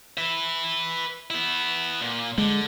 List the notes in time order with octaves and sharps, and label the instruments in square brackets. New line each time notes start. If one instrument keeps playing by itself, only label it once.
[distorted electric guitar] B4 E5
B3 E4
A#2
[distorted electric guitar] D3 [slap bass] G#3